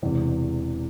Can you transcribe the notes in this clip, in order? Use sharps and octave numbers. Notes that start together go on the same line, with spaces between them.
E1 E2 C3